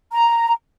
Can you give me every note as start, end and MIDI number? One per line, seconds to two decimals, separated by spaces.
0.12 0.51 82